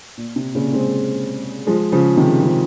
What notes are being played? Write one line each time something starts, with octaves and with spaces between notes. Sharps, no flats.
A#2
C3
A#2 C#3
G#3 C4
F3 G#3
C#3 F3
C3 D#3
C#3 F3